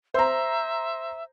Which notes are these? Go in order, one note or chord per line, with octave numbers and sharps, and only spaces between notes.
C5 E5 A#5